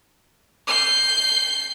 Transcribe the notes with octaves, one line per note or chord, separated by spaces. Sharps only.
G6 C7